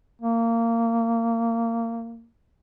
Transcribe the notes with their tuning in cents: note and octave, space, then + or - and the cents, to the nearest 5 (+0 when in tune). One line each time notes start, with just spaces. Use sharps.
A#3 -20